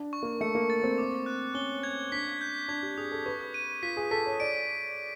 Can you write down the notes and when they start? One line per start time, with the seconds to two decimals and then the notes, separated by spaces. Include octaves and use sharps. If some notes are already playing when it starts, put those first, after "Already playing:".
Already playing: D4
0.13 C#6
0.23 A#3
0.41 A3 C#7
0.55 A#3
0.70 A6
0.83 C4
0.98 D6
1.26 F#6
1.54 C#4 G7
1.83 G#6
2.12 D4 B6
2.41 G6
2.68 D4 G#6
2.83 G4
2.97 G#4 D#6
3.12 A4
3.26 B4 C#6
3.54 D#7
3.83 F4 B6
3.97 G#4
4.11 A4 B6
4.26 C#5
4.40 D5 D7